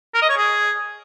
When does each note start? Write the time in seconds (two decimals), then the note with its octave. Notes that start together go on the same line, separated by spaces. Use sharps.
0.14 A#4
0.21 D#5
0.29 C#5
0.37 G#4